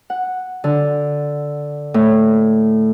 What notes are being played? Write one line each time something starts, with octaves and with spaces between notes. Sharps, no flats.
F#5
D3
A2